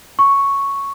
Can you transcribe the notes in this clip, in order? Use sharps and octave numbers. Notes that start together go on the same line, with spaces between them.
C#6